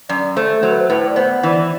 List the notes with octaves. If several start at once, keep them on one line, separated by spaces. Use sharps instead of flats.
F#2 D5
A3 C5
F#3 C5
B4
C5
A2 B4
D5
B3 C5
E3 D5